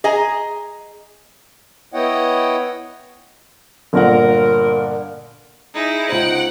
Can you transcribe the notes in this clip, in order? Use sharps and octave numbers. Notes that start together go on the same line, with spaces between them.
G#4 D#5 G#5 A#5
B3 E4 C#5 D#5 F#5 G5
G1 A#2 A#4 F#5
D#4 E4 G#4
C#2 D#4 C5 F#5 G5